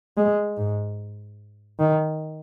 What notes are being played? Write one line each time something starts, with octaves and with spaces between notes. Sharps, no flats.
G#3
G#2
D#3